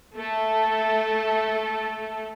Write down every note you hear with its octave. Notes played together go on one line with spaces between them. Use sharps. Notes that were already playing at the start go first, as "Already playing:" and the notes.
A3 A4